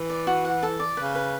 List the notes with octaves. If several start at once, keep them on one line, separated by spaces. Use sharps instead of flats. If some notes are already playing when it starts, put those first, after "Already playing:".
Already playing: E3
D5
F#4
F#5
A4
D5
C#3 B4
B4